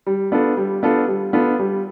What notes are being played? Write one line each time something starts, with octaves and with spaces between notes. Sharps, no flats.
G3
B3 D4 F4 A4
G3
B3 D4 F4 A4
G3
B3 D4 F4 A4
G3